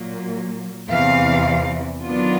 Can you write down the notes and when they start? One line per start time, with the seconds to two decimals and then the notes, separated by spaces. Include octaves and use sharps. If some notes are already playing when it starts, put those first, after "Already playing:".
Already playing: A#2 F#3 A#3
0.90 E2 C3 E3 F5
2.04 D#3 F#3 B3 D4 F4